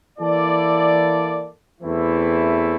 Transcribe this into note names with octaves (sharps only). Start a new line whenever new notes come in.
E3 A#3 E4 A4 D5
E2 E3 A3 C4 E4